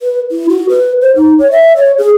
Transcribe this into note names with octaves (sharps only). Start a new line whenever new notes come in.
B4
E4
F#4
B4
C5
D#4
C#5
E5
C#5
G#4